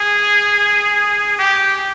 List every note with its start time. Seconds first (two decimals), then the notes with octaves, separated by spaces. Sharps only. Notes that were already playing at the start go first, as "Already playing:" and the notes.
Already playing: G#4
1.39 G4